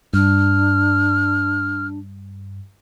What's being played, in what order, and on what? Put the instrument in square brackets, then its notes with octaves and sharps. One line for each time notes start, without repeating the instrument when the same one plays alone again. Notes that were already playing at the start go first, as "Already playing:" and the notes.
[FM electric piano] G2 [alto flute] D4 [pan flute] F6